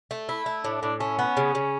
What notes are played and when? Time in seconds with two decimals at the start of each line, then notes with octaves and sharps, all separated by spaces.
0.11 A3
0.29 E4
0.46 A3
0.64 A2 D4
0.82 A2 D4
1.00 A3 C#4
1.19 B3
1.37 C#3
1.55 C#3